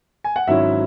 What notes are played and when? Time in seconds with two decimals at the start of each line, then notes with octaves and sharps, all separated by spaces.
0.24 G#5
0.36 F#5
0.47 G#1 G#2 F#3 C#4 E4 E5